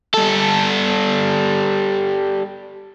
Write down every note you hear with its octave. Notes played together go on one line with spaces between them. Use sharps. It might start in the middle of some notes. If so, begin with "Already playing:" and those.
G3 A4